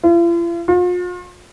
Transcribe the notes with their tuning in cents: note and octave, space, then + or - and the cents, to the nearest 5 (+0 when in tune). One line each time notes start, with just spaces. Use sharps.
F4 -45
F4 +40